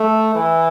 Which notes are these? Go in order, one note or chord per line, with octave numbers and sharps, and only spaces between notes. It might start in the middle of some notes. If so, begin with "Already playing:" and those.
Already playing: A3
E3